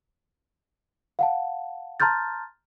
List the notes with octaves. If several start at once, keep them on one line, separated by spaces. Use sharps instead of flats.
F5 F#5 A5
A5 A#5 C6 F6 G6 A6